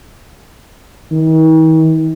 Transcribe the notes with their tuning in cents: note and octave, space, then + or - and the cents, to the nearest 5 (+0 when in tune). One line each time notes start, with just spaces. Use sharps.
D#3 +45